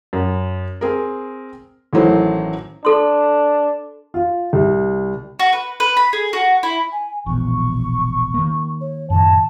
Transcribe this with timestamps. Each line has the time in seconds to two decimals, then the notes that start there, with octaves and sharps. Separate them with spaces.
0.13 F#2
0.81 C4 G#4 A#4
1.93 A1 D#3 E3 F#3 A3 C5
2.85 D4 A4 C6
4.14 F4
4.53 C2
5.39 F#4
5.53 B4
5.80 B4
5.97 B5
6.13 G#4
6.33 F#4
6.63 E4
6.92 G#5
7.26 E1 A#1 E2 C#6
8.34 D#3 A#3
8.81 C#5
9.10 F#2 A2 D#3 A5